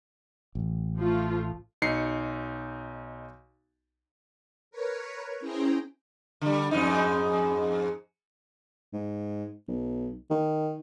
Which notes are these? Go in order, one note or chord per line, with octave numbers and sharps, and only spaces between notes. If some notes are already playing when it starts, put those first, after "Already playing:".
A1
F3 A3 F4
B1 D#4 C7 C#7
A#4 B4 C#5
C#4 E4 G#4 C5 G5 A#5
D3 G3
F2 G#2 D#4
G#2
B1
D#3